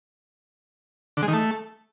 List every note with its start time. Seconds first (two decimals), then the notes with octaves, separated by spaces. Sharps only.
1.17 D3
1.22 G#3
1.28 D#3
1.33 A3